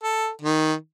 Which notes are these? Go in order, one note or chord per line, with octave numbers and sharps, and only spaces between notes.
A4
D#3